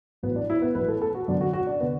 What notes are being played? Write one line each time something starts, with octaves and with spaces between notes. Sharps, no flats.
A1 A2 F#3 B3
D4
E4
B3
A1 A2 F#3 B4
A4
A4
F#4
F#2 D3 B3 D4
F#4
F#4
D4
D3 B3